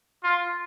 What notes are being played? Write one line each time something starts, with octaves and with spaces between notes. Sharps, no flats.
F4